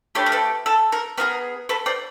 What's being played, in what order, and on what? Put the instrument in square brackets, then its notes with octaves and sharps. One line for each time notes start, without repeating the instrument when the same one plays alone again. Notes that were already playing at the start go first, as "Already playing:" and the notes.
[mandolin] A3 D4 G4 B4 C#5
A#4
A4 B4
A4
A#4
B3 D#4 G#4 A#4
A4 B4
C5 D5